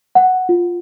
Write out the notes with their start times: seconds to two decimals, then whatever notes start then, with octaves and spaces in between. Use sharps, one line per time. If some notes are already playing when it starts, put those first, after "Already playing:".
0.15 F#5
0.49 F4